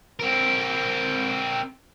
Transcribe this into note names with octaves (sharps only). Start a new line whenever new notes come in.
C4 A#4